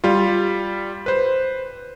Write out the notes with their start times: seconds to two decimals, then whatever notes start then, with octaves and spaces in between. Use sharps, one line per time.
0.04 G3 F4
1.06 B4 C5